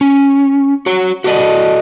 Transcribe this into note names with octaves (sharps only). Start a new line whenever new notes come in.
C#4
F#4 C#5
F#4 G4 A4 A#4 D5 D#5